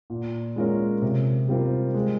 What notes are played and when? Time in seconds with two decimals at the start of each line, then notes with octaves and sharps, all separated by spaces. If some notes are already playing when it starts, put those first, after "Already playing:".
0.10 A#2
0.56 G#3 C#4 F4 A#4
1.02 C3
1.48 G3 C4 F4 A#4
1.94 G#3